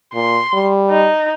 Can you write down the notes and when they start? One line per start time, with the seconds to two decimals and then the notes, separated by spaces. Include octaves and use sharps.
0.15 A#2 C6
0.53 G3
0.91 D#4